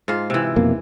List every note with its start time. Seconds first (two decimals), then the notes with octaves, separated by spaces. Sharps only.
0.08 G#2 F4
0.30 C3 E3
0.56 F2 B2 A#3